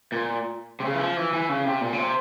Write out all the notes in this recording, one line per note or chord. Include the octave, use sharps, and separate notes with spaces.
A#2
C3
C#3
E3
F3
E3
E3
C#3
C3
A#2
C#3
C3